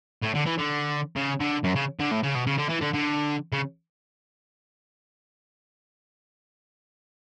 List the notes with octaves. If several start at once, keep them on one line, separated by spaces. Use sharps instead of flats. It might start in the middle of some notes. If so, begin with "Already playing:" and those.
A2
D3
E3
D3
C#3
D3
F#2
C#3
D3
A2
C#3
B2
C#3
D3
E3
D3
D3
C#3